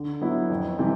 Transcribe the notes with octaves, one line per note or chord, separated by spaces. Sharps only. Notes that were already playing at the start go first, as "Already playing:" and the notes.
Already playing: D3
F#3 B3 E4
F2
C3 E3 G3